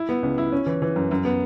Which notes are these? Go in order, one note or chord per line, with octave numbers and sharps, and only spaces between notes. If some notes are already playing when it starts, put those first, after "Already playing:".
Already playing: E4
B3
C#2
E4
C#4
E3
E3
F#2
F#2
B3